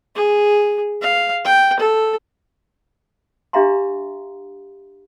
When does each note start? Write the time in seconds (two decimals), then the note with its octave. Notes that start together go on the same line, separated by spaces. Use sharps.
0.15 G#4
1.02 F5
1.45 G5
1.80 A4
3.53 D4 G4 E5 F5 A#5 C6